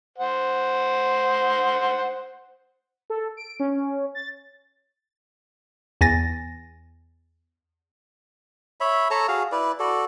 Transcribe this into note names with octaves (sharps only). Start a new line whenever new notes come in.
C5 F#5
A4
D7
C#4
A6
E2 G#5 A6 A#6
C#5 E5 B5
A4 C#5 A5 A#5
F#4 G#4 F5
E4 B4 D5
F#4 A4 D5